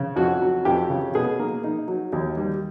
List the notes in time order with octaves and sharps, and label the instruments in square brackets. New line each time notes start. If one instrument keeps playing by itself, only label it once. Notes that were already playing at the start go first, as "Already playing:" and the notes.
Already playing: [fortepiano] C#3
F2 F#4
F#3
F2 G4
C#3
B2 G#4
A#3
D#4
F#3
D#2
G3